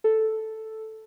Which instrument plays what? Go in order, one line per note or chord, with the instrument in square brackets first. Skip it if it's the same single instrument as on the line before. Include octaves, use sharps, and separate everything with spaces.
[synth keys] A4